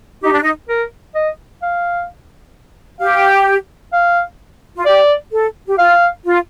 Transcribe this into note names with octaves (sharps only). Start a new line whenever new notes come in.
D#4 G4
D4
D#4
A#4
D#5
F5
G4 F5
F5
F4
G4 D5
A4
G4
F4 F5
F4